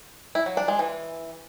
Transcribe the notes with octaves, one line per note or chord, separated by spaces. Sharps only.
E4
F#3
D4
G#3
E3